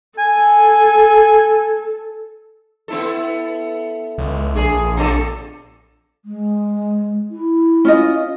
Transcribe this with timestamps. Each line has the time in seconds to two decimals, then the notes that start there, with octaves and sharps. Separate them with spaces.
0.19 A4 G#5
2.88 B3 E4 A4
4.18 C#2
4.55 A#1 D4 G#4
4.97 B2 D4 A4
6.25 G#3
7.31 E4
7.85 C#4 F4 D#5